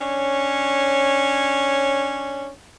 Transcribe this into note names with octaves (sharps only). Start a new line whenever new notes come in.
C#4 D4 C#5